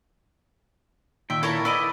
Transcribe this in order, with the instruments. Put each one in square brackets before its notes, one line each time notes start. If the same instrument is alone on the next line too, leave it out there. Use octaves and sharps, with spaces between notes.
[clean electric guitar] A#2 D#3 G5 [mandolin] E5
[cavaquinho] E4 A#4 A5 [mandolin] A4 C#5 C#6
[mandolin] E4 [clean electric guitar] B4 D5 D#5 [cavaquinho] B5 D6